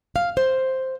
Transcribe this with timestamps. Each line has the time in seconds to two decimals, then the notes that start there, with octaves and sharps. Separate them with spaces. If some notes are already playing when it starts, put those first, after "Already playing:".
0.16 F5
0.37 C5